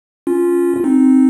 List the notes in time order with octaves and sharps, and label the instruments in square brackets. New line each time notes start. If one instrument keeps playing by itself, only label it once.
[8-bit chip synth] C#4 F4
F4
C4 D#4